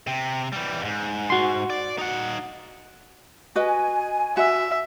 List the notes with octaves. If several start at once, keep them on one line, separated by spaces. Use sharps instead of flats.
C3
E3 G3
F2 G#2
F#4 C6
D5
D#4 F#5
F#4 B4 D#5 G#5
F#4 E5